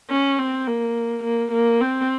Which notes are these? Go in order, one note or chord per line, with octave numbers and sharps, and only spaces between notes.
C#4
C4
A#3
A#3
A#3
C4